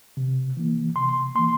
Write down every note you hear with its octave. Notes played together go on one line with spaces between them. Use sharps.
C3
E3 A#3
C3 C6
E3 A#3 C6